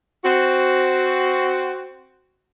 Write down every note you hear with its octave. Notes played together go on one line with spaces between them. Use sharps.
C4 F#4